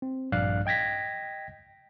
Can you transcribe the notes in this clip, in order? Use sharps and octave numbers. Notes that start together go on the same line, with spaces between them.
C4
A#1 G2 D5 F5 F#6
D#5 G5 G#6 A#6 B6